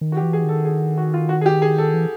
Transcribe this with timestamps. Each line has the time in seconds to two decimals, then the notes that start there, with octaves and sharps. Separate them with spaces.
0.01 D#3
0.12 F#4
0.17 G4
0.22 E3
0.33 G#4
0.44 D#3 A4
0.65 G#4
0.98 F#4
1.14 F4
1.29 F#4
1.41 G#4
1.46 G4
1.62 G#4
1.78 A4
1.94 E3